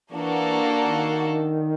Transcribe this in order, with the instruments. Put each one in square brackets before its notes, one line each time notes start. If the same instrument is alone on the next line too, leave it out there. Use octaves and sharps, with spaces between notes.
[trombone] E3 [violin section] A#3 D4 F#4 A4
[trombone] D#3